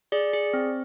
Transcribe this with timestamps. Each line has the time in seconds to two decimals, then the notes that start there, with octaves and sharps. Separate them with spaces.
0.12 G#4 D5
0.33 G#4
0.54 C4